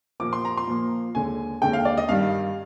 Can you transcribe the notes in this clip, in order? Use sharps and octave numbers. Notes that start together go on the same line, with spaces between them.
A#2 F3 A#3 D6
C6
A#5
C6
A#2 F3 A#3
D#2 D3 G#3 G#5
D#2 D3 G#3 G5
F5
D5
D#5
G2 D#3 G3 F5